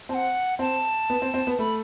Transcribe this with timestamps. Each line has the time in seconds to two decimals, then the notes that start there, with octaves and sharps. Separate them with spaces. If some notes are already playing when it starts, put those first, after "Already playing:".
0.09 C4 A5
0.14 F#5
0.59 C4 A5
1.10 B3
1.22 C4
1.34 C4
1.47 B3
1.59 A3 B5